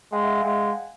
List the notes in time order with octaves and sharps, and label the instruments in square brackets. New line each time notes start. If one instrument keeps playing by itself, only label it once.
[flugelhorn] G#3 [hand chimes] F5 G5
[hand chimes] E5 F#5
F5 G5
[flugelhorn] G#3 [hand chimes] F#5 G#5